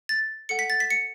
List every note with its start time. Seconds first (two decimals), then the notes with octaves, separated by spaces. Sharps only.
0.09 A6
0.49 A4 F#5 C#7
0.59 B6
0.70 A6
0.80 B6
0.90 C#7